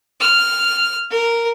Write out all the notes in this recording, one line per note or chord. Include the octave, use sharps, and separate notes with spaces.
F6
A#4